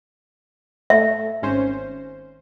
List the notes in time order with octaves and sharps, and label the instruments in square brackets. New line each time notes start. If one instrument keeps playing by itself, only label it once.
[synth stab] A3 [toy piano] E5
[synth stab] G#1 C#4 C5